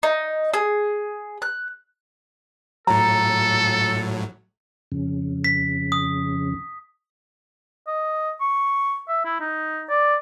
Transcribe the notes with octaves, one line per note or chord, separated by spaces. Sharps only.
D#4
G#4
F#6
A2 F#3 A4 A#5
F2 C#3
B6
D#6
D#5
C#6
E5
E4
D#4
D5